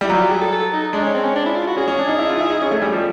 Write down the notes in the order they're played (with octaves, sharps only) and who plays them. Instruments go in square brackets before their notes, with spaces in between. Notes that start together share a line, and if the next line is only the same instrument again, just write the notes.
[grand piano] G3 [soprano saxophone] E4
[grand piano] F#3 [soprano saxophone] F4
[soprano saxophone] G4
G#4
A4
A4
D#4
[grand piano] G#3 [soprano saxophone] D4
[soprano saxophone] C#4
C4
C#4
D4
E4
F4
F#4
[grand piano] C#4 [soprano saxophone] G#4
[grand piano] C#4
D4
D#4
E4
F4
D#4
E4
D#4
C#4
A3
G3
F3